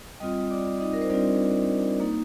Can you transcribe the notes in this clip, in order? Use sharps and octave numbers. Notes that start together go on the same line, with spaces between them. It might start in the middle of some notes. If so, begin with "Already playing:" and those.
G3 C4 F4 D#5 D#6
D5 D6
D#4 D#5
A#4
C5
G3 C4 D4 F4 D5
A#3 D#4